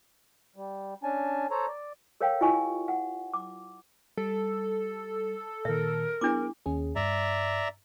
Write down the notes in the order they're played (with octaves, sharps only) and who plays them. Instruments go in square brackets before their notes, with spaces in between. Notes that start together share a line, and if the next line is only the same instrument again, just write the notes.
[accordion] G3
C#4 D4 G#5 A5
A4 C5 C#5 A#5
D5
[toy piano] A4 A#4 C#5 F5 G5
E4 F4 G4 D#5 G#5 C#6
F#5
D6
[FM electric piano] G3 [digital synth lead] A4
[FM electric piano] A#2 D#3 [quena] A#4 [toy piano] E5
[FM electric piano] B3 G#4 [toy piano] D4 E4 D6
[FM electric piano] D#2 C#4 G#4
[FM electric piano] G2 [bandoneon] D5 E5 A#5